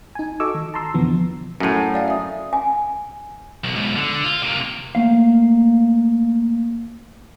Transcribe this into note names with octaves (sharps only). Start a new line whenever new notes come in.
D#4 G#5
F#4 A4 D#5 C#6 D6 E6
D#3
A5 A#5 C6 E6
F2 B2 D3 E3 F3 B3
F#2 A2 F#5 D#7
D5 F5 G#5
E5 D#6
G#5
B1
G#2 B2
D3
F4
C3 A#3
A3 A#3 F5